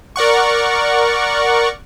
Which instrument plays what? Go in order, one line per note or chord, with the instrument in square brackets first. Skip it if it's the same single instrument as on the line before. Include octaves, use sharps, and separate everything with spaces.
[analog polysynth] A#4 D5 F#5 C#6